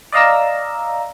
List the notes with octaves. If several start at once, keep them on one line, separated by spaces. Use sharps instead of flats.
D5 D#5 F5 A#5 E6